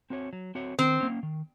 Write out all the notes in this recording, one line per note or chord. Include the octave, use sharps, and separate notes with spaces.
C4 F#4 C#5
F#3
C4 F#4 C#5
D#3 C4
A#3 C#4
D#3